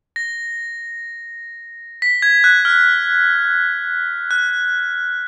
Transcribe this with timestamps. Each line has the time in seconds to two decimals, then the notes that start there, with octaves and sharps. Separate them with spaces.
0.16 A#6
2.02 B6
2.22 G#6
2.44 F#6
2.65 F6
4.31 F#6